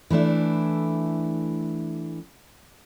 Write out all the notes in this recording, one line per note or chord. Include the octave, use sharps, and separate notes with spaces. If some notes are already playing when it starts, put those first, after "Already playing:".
E3 A3 D4 E4